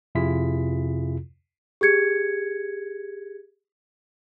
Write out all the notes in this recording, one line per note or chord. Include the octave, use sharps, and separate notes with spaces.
F2 C3 E4 F4 G#4 B6
G4 G#4 G#6 C#7